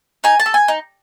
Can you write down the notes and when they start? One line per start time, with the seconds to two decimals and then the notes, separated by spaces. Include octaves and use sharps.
0.24 D#4 G#5
0.40 A5
0.46 A4
0.54 G#5
0.68 D#4